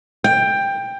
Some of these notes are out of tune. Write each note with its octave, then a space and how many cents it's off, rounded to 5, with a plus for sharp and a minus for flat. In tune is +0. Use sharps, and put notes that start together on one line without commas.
G5 +15